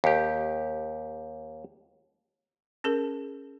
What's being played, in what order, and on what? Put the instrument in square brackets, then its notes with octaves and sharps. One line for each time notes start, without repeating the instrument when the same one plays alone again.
[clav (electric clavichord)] D#2 G4
[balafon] C#4 G#4 A#4